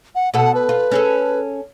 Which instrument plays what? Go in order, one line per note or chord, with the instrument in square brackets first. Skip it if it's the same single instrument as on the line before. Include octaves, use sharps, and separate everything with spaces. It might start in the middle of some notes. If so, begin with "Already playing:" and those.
[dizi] F#5
[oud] B2 A4 [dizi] F#5
[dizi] B4
[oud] F4
C#4 G#4 A4